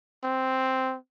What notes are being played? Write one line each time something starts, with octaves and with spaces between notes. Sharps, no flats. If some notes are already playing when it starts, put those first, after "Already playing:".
C4